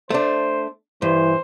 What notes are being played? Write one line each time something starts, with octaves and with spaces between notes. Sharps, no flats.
A3 D4 C5
G2 E3 C5